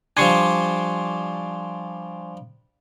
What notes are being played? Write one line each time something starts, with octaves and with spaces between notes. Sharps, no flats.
F3 G3 D4 G#5 C6 C#6